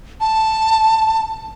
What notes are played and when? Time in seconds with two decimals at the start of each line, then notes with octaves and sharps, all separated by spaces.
0.21 A5